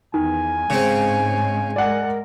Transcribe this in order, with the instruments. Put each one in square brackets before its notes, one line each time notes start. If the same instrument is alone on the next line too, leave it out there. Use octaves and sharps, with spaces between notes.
[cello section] E2 [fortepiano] D#3 [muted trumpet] G#5
[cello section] G#2 G#3 C#4 [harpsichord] C#3 C4
[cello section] G#3 A#4 [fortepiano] D5 F#5